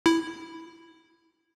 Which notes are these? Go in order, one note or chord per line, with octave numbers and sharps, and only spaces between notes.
E4